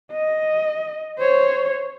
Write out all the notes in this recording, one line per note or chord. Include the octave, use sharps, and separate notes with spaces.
D#5
C5 C#5